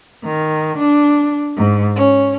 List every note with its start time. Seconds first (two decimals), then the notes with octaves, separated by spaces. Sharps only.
0.24 D#3
0.78 D4
1.57 G#2
1.97 C#4